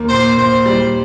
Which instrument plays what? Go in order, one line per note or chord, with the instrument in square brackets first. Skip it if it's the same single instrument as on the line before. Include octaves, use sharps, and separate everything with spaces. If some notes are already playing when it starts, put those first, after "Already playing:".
Already playing: [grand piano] D#2 A#3
[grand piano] A#2 [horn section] C5
[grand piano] A#2 [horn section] C5
[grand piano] G3